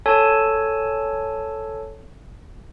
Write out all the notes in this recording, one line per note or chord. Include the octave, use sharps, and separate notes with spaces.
A4 C#5 G#5 A5